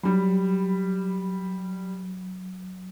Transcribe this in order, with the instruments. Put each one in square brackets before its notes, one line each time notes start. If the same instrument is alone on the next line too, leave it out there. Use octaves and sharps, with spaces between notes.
[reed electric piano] F#3 [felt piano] G3 B5